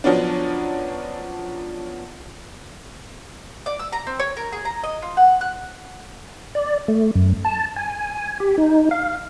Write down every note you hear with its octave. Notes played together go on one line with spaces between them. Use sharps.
F3 F#3 B3 C#4 D4
D5
E6
A#5
C4
C#5
A#4
G#4
A#5
D#5
F4
F#5
F#6
D5
A3
F#2
A5
G#5
G4
D#4
F5